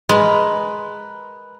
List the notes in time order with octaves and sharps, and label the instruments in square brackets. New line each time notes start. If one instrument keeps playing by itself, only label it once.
[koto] G#3 [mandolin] A#4 B4